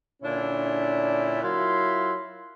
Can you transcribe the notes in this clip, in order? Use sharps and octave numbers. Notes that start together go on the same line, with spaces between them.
A#2 D3 C#4 D4 E4
F#3 E4 F4 A#4 E5 C6